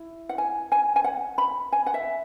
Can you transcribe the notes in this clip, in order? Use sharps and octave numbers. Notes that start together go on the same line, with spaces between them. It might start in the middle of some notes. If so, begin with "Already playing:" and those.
Already playing: E4
F#5
G#5
G#5
G#5
F#5
B5
G#5
F#5
E5